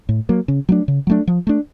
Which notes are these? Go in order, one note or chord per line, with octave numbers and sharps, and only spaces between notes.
A2
F#3 A#3
C#3
F#3 A3 D4
C#3
F#3 A3 D4
F3
A3 D4